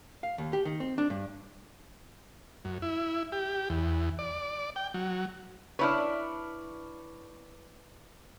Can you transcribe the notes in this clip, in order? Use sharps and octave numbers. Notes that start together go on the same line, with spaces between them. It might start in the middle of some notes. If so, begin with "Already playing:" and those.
F5
D#2
G4
D#3
C4
D4
G2
F#2
E4
G4
E2
D5
G5
F#3
D4 E4 B4 C#5 B5 F6